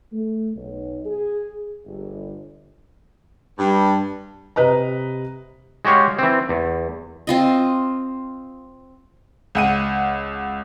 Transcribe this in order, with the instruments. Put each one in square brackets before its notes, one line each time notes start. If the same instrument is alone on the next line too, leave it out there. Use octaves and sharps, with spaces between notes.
[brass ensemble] A3
B1
G#4
G1
[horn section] G2
[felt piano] C3 B4 D#5 A#5
[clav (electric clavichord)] G#3 F#4 G4 C#5 F5
E3 C4
E2
[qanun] C4 F4 D#5
[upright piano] C#2 F#5 D#7